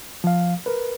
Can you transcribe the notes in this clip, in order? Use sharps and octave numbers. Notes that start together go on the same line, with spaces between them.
F3 F5
A#4 B4